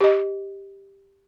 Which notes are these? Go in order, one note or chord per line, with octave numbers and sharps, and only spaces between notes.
G4 D#5